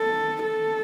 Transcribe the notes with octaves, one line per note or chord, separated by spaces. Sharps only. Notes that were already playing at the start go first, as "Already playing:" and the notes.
Already playing: A4
A4